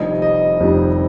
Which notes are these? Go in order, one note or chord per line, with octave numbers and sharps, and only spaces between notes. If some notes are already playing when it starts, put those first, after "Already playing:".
Already playing: F1 F2 D#3 G3 D4 D#5
D#5
F1 F2 D#3 G3 D4